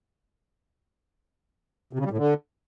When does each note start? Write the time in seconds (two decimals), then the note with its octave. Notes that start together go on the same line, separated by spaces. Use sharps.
1.93 C3
1.99 C#3
2.05 G3
2.11 A2
2.17 D3